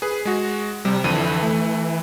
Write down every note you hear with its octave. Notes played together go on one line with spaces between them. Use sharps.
G#4 B4
G#3 F#4
C3 G3
F2 D3 E3 D#7
A3